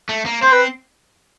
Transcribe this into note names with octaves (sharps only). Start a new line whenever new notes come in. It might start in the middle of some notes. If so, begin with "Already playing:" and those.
A3
A#3
C4 C5
B4